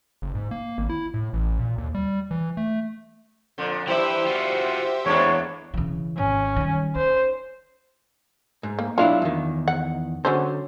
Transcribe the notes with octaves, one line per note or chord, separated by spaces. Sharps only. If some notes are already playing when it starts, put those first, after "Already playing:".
F#1
G#2
A#3
G#1
E4
A2
A1
A#2
D#2
G3
E3
A3
F2 A#2 D3
G2 E3 E4 G4 C5 E5
F4 F#4
E2 G#3 A#3 D4 C#5
C#3 E3
G#1 C#4
D#3 G3
D#4 C5
G#2
A#3
F#3 D4 E4 F4 F5
E2 D#3
F#5
D3 F#3 C#4 C5